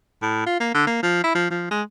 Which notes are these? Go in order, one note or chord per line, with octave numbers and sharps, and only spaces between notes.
A2
F4
A#3
D3
A#3
F3
E4
F3
F3
G#3